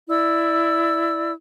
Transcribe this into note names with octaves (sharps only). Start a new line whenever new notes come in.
E4 D5 E6